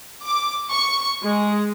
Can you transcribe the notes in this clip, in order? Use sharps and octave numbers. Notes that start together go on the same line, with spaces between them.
D6
C#6
G#3